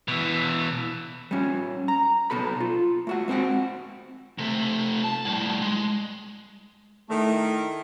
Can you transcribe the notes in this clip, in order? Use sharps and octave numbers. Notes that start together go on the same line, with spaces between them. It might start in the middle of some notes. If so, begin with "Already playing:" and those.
B2 E3
G3 C#4
A#5
B1 B2 A4 B5
F4
A3 F#4 F#5
G#3 C4 F#4 F#5 G5
C3 A3
A5
A2 G3
G#3
D#3 A3 E4